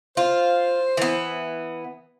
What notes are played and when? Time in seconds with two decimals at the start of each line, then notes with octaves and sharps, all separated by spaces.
0.17 F4 C5
0.97 E3 B3